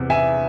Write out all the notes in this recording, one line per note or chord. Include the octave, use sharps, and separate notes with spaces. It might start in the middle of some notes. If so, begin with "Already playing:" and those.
Already playing: E2 C3
E5 G#5